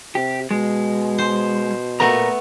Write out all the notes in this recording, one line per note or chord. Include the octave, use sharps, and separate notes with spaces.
C3 G4
B2 G#3
C5
A#2 A3 B3 A#4 A#5